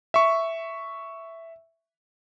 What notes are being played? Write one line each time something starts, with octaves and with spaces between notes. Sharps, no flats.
E5 C#6